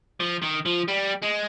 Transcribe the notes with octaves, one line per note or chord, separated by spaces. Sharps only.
F3
D#3
F3
G3
G#3